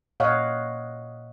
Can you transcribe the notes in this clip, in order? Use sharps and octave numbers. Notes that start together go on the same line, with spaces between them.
A#2 C#5 D#5 F5 F#5